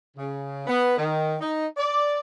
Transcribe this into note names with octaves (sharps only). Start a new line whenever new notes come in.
C#3
B3
D#3
D#4
D5